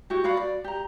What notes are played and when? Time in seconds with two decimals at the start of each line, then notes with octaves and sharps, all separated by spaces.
0.10 E4 F#4 G4
0.24 F#4 D5 F5 B5
0.37 D5
0.64 G4 A#5